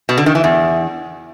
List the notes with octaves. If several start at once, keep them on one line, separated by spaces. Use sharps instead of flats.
B2
D3
D#3
E3
E2